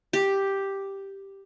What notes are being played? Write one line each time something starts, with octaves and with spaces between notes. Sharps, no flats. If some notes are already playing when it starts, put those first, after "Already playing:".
G4